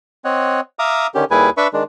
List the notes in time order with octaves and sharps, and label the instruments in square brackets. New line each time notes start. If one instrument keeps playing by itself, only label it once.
[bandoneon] C4 C#5 D#5 F#5
E5 F5 A#5 D6 D#6
D3 D#3 C#4 G4
D#2 G3 E4 G#4 B4 G#5
D4 B4 E5 B5 C#6
D#3 G#3 D4